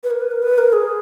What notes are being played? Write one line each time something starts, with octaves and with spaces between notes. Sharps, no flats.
B4
A#4
B4
A#4
B4
A#4
G#4